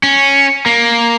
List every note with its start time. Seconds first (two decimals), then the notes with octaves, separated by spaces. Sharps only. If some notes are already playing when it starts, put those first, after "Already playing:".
0.03 C#4
0.66 A#3